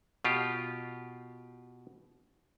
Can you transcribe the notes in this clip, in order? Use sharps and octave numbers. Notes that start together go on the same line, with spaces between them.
B2 F4 G4